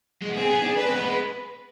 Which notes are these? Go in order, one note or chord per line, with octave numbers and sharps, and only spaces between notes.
G#3
B3
C4 G#4
B3
D4
D4 B4
C4
G#3
B3
G#3